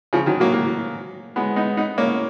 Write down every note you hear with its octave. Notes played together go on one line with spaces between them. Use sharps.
C#3 F3
D#3 F#3
F#3 A#3
F#3 A#3
G#3 B3
B3 D#4
B3 D#4
A#3 C#4